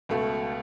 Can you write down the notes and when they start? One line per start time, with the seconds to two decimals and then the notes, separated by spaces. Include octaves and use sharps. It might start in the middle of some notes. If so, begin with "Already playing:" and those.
0.09 C#2 B2 A3